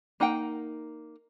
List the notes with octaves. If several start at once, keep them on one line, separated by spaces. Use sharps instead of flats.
A#3 D#4 F#5 G5